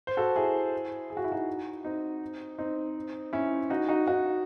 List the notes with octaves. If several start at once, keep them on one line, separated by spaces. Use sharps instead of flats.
C5
F#4 A4
E4 G#4
G#4
F#4
E4
D#4 F#4
C4 D#4
C4 D#4
C#4 E4
D#4 F#4
D#4 F#4
D#4 F#4